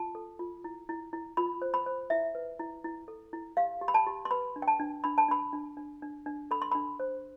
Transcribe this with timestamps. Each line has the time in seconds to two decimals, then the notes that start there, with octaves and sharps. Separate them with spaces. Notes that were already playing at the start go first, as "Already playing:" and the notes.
Already playing: F4 A5
0.15 A4
0.39 F4
0.64 E4
0.89 E4
1.13 E4
1.37 F4 B5
1.62 C5
1.74 B5
1.86 C5
2.10 E4 E5
2.35 B4
2.59 E4
2.84 E4
3.08 A4
3.33 E4
3.57 G4 F5
3.81 G4
3.88 B5
3.94 A5
4.07 G4
4.25 C6
4.31 B4 B5
4.56 D4
4.62 G5
4.68 A5
4.80 D4
5.04 D4 B5
5.18 A5
5.28 D4 B5
5.53 D4
5.77 D4
6.02 D4
6.26 D4
6.51 A4 B5
6.62 C6
6.71 D4 B5
7.00 C5